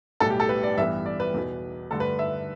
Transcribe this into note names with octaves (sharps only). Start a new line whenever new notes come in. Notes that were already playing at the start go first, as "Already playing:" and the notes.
B1 A2 G3 B3 A4
G4
A4
B4
D5
A1 G2 E3 B3 E5
D5
B4
E2 B2 B3
G2 D3 A3 A4
B4
E5